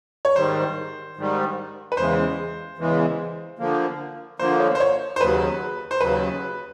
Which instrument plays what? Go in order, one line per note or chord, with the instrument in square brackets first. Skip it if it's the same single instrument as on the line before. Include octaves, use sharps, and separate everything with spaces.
[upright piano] C#5
[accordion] G#2 D#3 G3 [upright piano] C5
[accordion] G#2 D#3 G3
[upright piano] B4
[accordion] E2 C#3 E3 G#3 [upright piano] C5
[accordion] E2 C#3 E3 G#3
D3 F3 A#3
[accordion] D3 F3 A#3 [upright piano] C5
[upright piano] C#5
C5
C#5
C5
[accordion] D#2 C#3 F#3 [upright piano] B4
[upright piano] C5
[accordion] D#2 C#3 F#3 [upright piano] B4